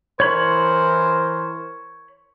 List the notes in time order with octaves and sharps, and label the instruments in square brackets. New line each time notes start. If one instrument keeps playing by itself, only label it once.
[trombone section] E3 A#4 C5 [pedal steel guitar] C#5 B5